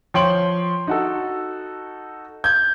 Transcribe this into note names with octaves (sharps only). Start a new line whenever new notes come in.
F3 C#5 G5 C6 D7 F#7
D#4 F#4 A4
G6 G#6